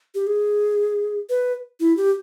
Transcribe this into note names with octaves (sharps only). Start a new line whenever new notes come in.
G4
G#4
B4
E4
G4